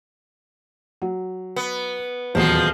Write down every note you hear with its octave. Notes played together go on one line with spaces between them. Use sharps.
F#3
B3
D#1 E2 F3 F#3 G#3